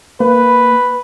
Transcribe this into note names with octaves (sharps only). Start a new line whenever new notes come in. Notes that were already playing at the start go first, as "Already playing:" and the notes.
A#3 B4